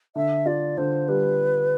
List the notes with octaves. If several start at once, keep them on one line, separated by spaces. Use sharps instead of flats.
D3 E5
F4 D5
D3 C5
G3 B4